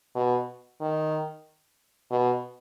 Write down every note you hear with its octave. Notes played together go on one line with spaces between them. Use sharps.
B2
D#3
B2